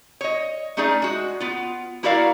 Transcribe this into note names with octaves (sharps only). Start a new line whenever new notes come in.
C#5 D#5
A3 C#4 D#4 G#4 D5
G#3 F#4
B3 F4
A#3 E4 F#4 A#4 D5 F5